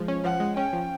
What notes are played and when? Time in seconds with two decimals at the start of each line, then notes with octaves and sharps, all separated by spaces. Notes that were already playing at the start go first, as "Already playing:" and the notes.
Already playing: F3 G#3
0.08 C#4
0.24 F3 F#5
0.40 G#3
0.57 C#4 G5
0.73 F3